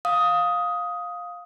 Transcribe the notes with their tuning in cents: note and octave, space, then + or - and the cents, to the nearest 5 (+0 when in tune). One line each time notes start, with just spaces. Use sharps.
F5 +15 D#6 +10